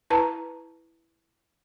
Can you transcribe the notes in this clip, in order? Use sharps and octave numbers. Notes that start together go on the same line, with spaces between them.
E4 B4 A5 A#5